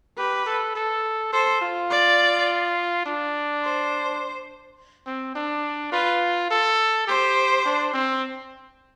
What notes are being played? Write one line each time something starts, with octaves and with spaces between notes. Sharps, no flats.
G4 B4
A4
A4
A4 C5
F4
D5
D4
C5
C4
D4
F4 B4
A4
G4 C5
D4
C4